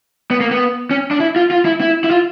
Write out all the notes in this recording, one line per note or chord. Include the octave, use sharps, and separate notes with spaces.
B3
A#3
B3
C#4
D4
E4
F4
F4
E4
E4
E4
F4